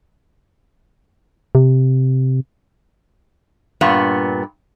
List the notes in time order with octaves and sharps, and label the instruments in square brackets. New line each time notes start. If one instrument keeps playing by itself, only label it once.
[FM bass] C3
[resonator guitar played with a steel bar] G2 A#2 B3